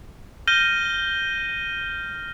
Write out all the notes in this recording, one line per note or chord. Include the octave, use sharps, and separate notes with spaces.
F6 G6 A#6 D#7 G7